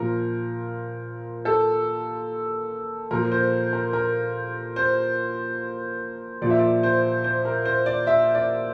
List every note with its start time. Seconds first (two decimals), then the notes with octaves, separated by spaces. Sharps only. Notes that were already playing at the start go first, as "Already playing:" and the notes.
Already playing: A#2 F3 A#4
1.45 A4
3.11 A#2 F3 A#4
3.32 C5
3.73 A#4
3.93 A#4
4.76 C5
6.42 A#2 D5
6.46 F3 E5
6.59 D5
6.83 C5
7.24 C5
7.45 A#4
7.65 C5
7.86 D5
8.07 E5
8.35 D5